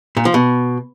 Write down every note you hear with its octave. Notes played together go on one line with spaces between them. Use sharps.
A#2
F3
B2